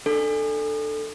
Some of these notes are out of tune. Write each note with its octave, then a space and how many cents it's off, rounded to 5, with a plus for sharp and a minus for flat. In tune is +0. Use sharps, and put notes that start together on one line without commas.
D4 +30 A4 +0